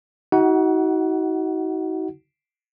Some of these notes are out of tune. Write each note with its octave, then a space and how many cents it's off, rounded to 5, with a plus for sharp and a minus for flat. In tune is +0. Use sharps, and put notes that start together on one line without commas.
D#4 +45 F#4 +25 F#5 +5